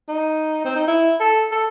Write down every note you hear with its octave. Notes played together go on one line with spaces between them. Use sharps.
D#4
C4
D#4
E4
A4
A4